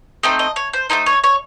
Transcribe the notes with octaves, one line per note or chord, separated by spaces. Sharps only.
A3 C4 D#4 D#5
D#5
C#5
C5
A3 C4 D#4 C5
C#5
C#5